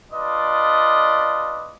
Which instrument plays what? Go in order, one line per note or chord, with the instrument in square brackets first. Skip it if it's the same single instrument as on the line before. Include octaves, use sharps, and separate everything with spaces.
[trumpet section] D4 F4 B4 D5 D#5